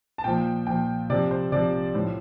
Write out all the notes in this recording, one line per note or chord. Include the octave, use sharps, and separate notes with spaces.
A5
A#2 F3 G5
A#2 F3 G5
C3 F3 D5
C5
C3 F3 D5
A2 F3